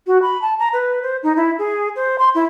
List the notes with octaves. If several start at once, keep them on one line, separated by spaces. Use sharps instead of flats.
F#4
B5
A5
A#5
B4
C5
D#4
E4
G#4
C5
C6
E4